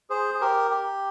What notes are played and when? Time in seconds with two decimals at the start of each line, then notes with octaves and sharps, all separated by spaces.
0.10 G#4 C5
0.34 G#4
0.41 G4 A#4
0.71 G4